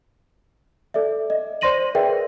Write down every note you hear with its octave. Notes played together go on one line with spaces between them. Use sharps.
A4 D5 E5
D#5
C5 D5 C6 A#6 D#7 F#7
G#4 A#4 B4 D5 E5 G5